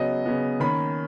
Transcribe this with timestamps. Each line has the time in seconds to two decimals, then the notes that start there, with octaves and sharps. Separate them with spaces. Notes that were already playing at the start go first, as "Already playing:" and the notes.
Already playing: C#3 F#3 B3 D#5
0.26 C#3 F#3 B3
0.60 D#3 A#3 C#4 B5